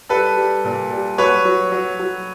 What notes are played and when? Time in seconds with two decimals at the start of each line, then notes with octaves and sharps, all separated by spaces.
0.09 G3 A4 B4
0.37 G3
0.64 A#2
0.91 G3
1.18 F#3 B4 C#5
1.45 F#3
1.72 F#3
1.99 F#3